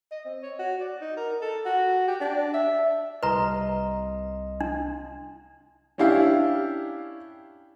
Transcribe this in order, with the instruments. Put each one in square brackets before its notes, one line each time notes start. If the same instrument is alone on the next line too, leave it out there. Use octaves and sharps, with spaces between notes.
[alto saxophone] D#5
C4
C#5
F#4
D5
D#4
A#4
A4
F#4
G4
D4
E5
[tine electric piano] C2 D#5 C6 [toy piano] B4 A#5
[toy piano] D4
[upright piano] C#4 D4 E4 G4 F5